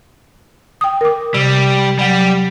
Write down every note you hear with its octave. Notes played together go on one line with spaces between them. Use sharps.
G5 D#6
A#4 D6
C3 G3
F#3 G3 F#5 G5